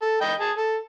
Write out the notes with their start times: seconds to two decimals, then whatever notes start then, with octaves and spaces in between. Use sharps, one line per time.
0.01 A4
0.21 D#5 G5 B5
0.40 G#4 A5
0.57 A4